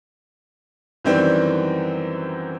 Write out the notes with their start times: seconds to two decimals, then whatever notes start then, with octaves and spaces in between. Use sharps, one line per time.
1.04 F#2 D#3 E3 G3 C4